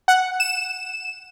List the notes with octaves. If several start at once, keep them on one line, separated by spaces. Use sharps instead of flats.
F#5
E7